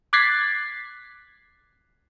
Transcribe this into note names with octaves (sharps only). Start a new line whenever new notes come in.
D6 F#6 G#6 A6 B6 C7